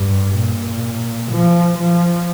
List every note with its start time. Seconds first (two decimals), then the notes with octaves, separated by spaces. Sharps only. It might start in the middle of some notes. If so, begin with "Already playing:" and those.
Already playing: G2
0.37 A#2
1.31 F3
1.78 F3